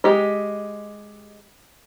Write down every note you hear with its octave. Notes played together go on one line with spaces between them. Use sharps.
G#3 G4 D#5